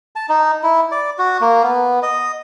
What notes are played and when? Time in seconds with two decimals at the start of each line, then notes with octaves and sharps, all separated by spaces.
0.16 A5
0.29 D#4
0.63 E4
0.92 D5
1.19 F#4
1.41 A#3
1.63 B3
2.03 D#5